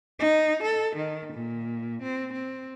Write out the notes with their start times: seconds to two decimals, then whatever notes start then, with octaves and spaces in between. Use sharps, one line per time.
0.19 D#4
0.63 A4
0.96 D#3
1.33 A#2
2.02 C4
2.33 C4